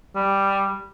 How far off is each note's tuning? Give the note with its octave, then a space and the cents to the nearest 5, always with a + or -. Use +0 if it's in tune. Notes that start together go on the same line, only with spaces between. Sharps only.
G3 +5